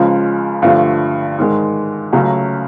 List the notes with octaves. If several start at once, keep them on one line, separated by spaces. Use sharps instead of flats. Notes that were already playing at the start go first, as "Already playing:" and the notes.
Already playing: C#2 C#3 F3 G#3
G2 D3 F3 A3
G#2 D#3 G#3
C#2 C#3 F#3 A3